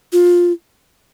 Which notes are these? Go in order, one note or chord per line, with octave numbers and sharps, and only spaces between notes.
F4